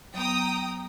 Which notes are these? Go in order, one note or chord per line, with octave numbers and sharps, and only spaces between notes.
F#3 B3 G5 A#5 D#6